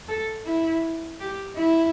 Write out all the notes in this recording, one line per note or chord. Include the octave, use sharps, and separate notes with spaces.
A4
E4
G4
E4